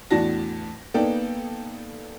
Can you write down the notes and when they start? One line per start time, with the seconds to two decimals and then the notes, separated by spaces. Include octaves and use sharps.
0.11 E2 A2 D4 F#4 A5 A#6
0.94 A#3 B3 D#4 A4 D5 G5